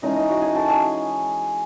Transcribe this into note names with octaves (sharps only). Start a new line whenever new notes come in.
E3 G#3 C#4 D#4 E4 D#5
D#4 D#5
F#4 F#5
G#4 G#5
A4 A5
G#4 G#5